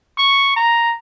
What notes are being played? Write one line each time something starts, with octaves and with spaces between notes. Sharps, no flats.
C#6
A#5